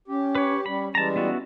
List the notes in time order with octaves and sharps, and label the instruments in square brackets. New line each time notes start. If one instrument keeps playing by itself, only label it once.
[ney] C#4 [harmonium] G4
[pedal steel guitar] B4 C#5
[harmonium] G3 [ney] C#4 [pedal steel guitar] B5
[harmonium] E3 G3 G#3 [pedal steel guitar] A5 A#5
[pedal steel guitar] B3 E4 F#4